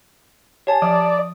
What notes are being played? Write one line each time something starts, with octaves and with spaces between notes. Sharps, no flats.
G4 C#5 G#5 A5
F3 D5 D#6